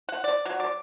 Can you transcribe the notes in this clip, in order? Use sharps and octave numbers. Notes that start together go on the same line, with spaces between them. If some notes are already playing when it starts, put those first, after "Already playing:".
F#5
D5
F#3
D5